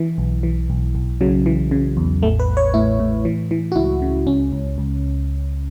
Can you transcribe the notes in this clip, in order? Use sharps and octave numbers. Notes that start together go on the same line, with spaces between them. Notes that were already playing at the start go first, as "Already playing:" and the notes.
Already playing: E3
B1
E3
B1
B1
C#3 F#3
E3
C#3
E2
A1 A3
B4
A1
C#5
A2 E4
A2
E3
E3
F#4
C#2 E4
C#3
C#2 C#4
C#2
C#2